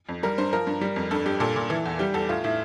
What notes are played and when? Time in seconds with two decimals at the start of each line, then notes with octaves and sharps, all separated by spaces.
0.09 F2
0.23 G3 A#4
0.38 G2 C5
0.53 F3 A#4
0.67 G2
0.81 G3
0.96 F2
1.11 G2 A4
1.26 G2 G4
1.40 A#2 A4
1.56 A#2
1.70 E3
1.86 E2
1.99 G3 G4
2.14 E2 A4
2.29 A2 F4
2.44 A2 E4